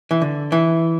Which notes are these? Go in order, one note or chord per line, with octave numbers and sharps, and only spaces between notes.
E3
D3
E3